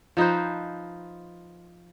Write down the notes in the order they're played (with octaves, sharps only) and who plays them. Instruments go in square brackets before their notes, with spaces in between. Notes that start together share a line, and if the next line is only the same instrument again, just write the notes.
[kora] F3 D#4 B4 C5